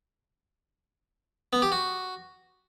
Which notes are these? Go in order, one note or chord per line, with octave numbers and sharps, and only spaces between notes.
B3
G4
F#4